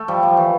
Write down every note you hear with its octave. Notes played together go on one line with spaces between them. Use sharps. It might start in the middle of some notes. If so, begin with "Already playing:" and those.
Already playing: A3
F3 G3
F3
E3